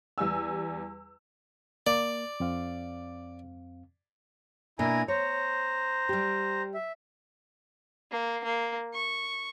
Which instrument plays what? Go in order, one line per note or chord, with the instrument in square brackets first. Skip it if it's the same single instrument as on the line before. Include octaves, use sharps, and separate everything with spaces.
[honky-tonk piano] E2 G3 G#5 E6
[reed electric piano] A#3 [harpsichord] D5
[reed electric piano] F2 C4 F5
[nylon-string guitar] B2 A#3 D4 [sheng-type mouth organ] E4 G#5 A#5
[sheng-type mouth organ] C5 A#5 [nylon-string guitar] C#5
[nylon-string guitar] G3 G4
[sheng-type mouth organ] E5
[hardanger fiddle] A#3
A#3
C#6